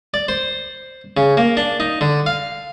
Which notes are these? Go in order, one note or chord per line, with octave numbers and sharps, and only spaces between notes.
D5
C5
C#3
A#3
D4
D#4
D3
F5